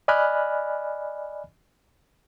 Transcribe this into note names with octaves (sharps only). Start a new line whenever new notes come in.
D5 D#5 G#5 B5 F6 F#6